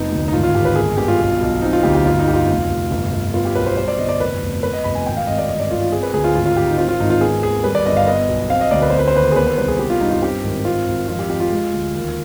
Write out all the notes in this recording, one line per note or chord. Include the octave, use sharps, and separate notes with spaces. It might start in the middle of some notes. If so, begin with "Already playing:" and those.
Already playing: F1 B3 D#4
D2
D#4
G#1 F4
F4
G#1 G4
B4
G1 G#4
G1 G4
F4
B1
B1
C4 D#4
F4
D2 G4
G4
G1 F4
D#4
G1 G4
F4
F1
F1
G1
G1
B3 F4
G4
B1 B4
C5
G3 C5
D5
G1 D#5
D5
F1 B4
F1
B3 B4
D#5
F1 B5
G#5
G#1 G5
F5
G#1 D#5
D5
G1 D#5
D5
G1 F4
F4
C4 G#4
B4
D2 G#4
F4
G#1 F4
F4
G#1 G4
D#4
C4 F4
F4
G#1 D#4
F4
B3 G#4
D#2 G#4
G3 B4
D5
G1 D#5
F5
B3 D#5
B1
C4 F5
D#5
D2 D5
B4
C4 C5
B4
C5
D#2 B4
G#4
B3 B4
C5
C2 B4
G#4
B3 G4
F4
G2 D#4
F4
C4 G4
G#1
C4 F4
G#1
F2 F4
G4
F2 G4
F4
G#3
D2
D#2